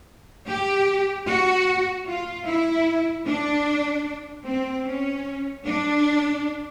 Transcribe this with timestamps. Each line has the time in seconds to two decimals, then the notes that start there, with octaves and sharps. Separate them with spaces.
0.49 G4
1.27 F#4
2.07 F4
2.47 E4
3.27 D4
4.46 C4
4.86 C#4
5.65 D4